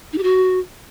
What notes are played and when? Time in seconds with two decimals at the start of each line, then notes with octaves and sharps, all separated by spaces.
0.13 D#4
0.18 G4
0.23 F#4